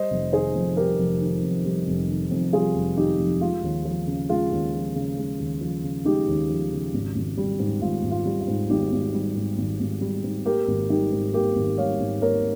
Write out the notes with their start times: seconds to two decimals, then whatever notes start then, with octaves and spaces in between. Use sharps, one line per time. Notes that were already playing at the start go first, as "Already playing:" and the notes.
Already playing: G3 C5 D#5
0.11 F1
0.32 D#3 G#4 C5
0.55 F2
0.77 G3 G4 A#4
0.99 F1
1.21 D#3
1.43 F2
1.65 G3
1.87 F1
2.09 D#3
2.31 F2
2.53 G3 F4 G#4
2.75 F1
2.97 D#3 D#4 G4
3.19 F2
3.41 G#3 F4
3.63 D#2
3.85 F3
4.07 C#3
4.29 G#3 F4
4.51 D#2
4.73 F3
4.95 C#3
5.17 G#3
5.39 D#2
5.61 F3
5.83 C#3
6.05 G#3 D#4 G4
6.27 D#2
6.49 F3
6.72 C#3
6.94 G#1
7.16 G#1
7.37 G3
7.59 G#2
7.82 G#1 F4
8.03 G#1
8.11 F4
8.26 G3
8.41 F4
8.47 G#2
8.70 G#1 D#4 G4
8.92 G#1
9.14 G3
9.36 G#2
9.58 G#1
9.80 G#1
10.01 G3
10.24 G#2
10.46 A#3 G4 A#4
10.67 G#1
10.90 G3 D#4 G4
11.12 G#2
11.34 A#3 G4 A#4
11.56 G#1
11.78 G3 C#5 F5
12.00 G#2
12.22 A#3 A#4 C#5